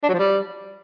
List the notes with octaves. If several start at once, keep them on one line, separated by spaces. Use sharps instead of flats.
D4
F#3
F3
G3